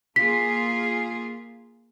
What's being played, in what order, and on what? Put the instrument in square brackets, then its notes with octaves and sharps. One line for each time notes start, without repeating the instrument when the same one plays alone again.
[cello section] A#3 F4 G#4 [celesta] B6